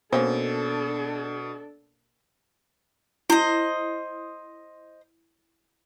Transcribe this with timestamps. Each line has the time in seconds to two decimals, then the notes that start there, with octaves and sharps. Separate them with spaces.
0.13 B2 A#3 C#4 D4 A4 C5
3.30 E4 C5 D#5